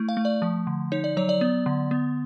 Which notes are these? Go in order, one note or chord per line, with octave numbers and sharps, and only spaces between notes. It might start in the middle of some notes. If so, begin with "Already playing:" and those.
Already playing: A3 E4
F5
A3
D5
F3
D3
D#4 C#5
D5
F#3 C#5
D5
B3
D3
B3